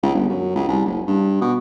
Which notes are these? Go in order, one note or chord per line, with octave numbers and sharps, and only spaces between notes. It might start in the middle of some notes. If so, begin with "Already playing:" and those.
C#2
G1
F#2
C#2
C2
F#1
G2
B2